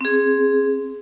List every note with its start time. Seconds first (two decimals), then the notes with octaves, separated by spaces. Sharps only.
0.01 C4 G#4